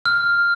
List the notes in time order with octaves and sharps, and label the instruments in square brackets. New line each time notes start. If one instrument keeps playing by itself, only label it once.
[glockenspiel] F6